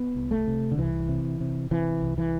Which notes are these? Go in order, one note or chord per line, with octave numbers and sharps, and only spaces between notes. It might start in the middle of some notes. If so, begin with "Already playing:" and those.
Already playing: B3
C2
A3
C3
D3
C2 E3
C3
C3
C3 E3
C2
E3